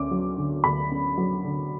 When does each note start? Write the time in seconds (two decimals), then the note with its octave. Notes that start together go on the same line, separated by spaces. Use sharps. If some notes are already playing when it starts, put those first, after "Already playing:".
Already playing: D2 C#4 D6
0.11 F#3
0.37 D3
0.64 D2 B5
0.92 C#4
1.18 F#3
1.45 D3